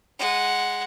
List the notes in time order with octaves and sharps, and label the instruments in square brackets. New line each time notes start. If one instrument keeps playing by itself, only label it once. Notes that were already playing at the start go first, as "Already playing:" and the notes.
[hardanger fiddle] G#3 F#5